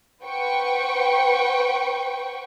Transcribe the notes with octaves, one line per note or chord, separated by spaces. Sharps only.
B4 C5 F#5 G5 C#6